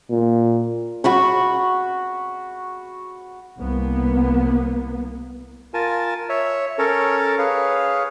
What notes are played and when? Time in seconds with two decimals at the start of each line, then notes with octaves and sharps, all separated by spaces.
0.11 A#2
1.04 F#4 B5 C#6
3.58 C2 A#3 B3
5.74 F4 A#4 G#5 A5
6.29 C#5 E5
6.78 C#4 A4 A#4 C#5
7.39 G#4 B4 C#5 F5